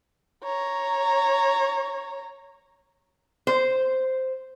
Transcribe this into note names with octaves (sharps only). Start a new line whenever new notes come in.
C#5 A#5
C5